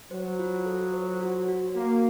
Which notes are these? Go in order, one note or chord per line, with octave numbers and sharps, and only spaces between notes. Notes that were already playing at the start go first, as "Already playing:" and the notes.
F#3 C5
F4
A4
C5
F#4
F#4
A#3 F#4